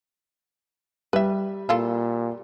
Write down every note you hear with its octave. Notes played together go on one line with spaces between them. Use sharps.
G3 B4 E5
A#2 E4 F4 A4